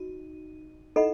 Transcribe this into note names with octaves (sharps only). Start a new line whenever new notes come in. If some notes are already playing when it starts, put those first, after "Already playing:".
Already playing: D#4 F#4
D#4 E4 A4 D#5 F#5 B5